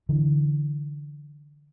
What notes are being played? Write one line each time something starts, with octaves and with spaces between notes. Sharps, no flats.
D3 E3